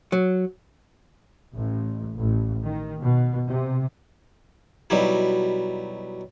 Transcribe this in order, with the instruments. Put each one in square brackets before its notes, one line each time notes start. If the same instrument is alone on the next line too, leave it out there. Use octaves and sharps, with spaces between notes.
[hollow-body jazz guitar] F#3
[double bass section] A1
A1
D#3
B2
C3
[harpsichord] B2 F#3 G3 D#4 E4